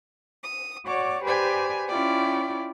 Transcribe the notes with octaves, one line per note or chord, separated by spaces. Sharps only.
D#6
F#4 C#5 D5 D6
G4 G#4 B4 C5 D5 G#5
C#4 E4 F4 D5 G5